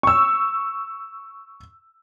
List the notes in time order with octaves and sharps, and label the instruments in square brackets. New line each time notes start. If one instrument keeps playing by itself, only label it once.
[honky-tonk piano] C#6 E6